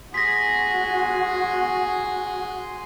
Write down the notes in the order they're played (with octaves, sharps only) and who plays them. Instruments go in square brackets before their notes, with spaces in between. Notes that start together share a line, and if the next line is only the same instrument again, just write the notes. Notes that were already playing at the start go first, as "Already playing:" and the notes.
[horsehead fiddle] F#4 [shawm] G#4 [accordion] G#5 C6 [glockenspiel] A#6 B6